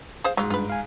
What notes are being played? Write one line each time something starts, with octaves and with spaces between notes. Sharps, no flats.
G#4 C5 F5
G#2 F#3 F4
G2 F4 B4
F5 G#5